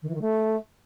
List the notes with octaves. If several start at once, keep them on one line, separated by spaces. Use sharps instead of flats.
D#3
E3
D#3
A3